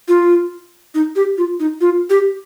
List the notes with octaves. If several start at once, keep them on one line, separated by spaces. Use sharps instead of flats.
F4
D#4
G4
F4
D#4
F4
G4